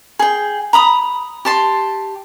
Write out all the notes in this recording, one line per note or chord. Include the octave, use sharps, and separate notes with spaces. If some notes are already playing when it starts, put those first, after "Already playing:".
G#4 G5
A#5 B5 D#6
G4 A5 C6